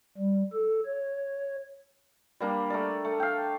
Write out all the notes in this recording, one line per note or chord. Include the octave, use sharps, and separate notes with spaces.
G3
A4
C#5
G3 A#3 D4
A3 A#4 D5
A3
F5 G5